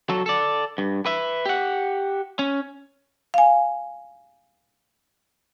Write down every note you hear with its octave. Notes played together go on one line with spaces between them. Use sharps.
F#3 A4
A4 D5
G2
B4 E5
G4 F#5
C#4
F5 G#5